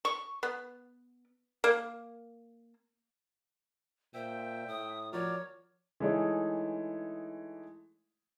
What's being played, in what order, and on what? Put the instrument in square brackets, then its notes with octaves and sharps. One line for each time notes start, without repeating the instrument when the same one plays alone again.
[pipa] C#6
B3
A#3
[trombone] A#2 [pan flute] C5 [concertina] E5 G5
[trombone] A2 [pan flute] D#6
[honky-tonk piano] F3 [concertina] F#4 A#4 D5 [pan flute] C#5
[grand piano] E3 G#3 A3 D#4 G#4 C#5